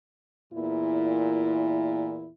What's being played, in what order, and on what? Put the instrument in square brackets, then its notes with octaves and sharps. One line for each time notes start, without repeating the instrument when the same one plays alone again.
[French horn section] E2 A#2 E4